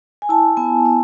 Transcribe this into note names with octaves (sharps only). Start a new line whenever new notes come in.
G#5
E4 A5
B3 G#5
B3